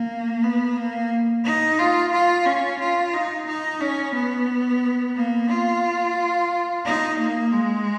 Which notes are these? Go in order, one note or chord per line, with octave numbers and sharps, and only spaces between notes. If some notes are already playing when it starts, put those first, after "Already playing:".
Already playing: A#3
B3
A#3
D#4
F4
F4
C#4
F4
D#4
D#4
C#4
B3
A#3
F4
D#4
A#3
G#3